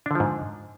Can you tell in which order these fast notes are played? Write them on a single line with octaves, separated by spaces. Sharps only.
D4 D3 F3 G#2